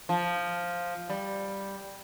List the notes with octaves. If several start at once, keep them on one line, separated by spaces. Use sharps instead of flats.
F3
G3